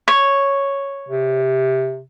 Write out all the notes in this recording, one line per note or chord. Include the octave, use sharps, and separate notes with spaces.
C#5
C3